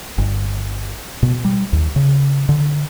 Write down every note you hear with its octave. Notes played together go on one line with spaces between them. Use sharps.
G1
B2
G3
D#2
C#3
D3